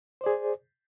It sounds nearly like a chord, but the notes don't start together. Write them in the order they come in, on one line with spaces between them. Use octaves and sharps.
C5 D5 G#4